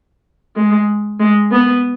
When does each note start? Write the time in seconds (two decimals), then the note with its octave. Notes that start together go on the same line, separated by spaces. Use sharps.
0.56 G#3
1.20 G#3
1.52 B3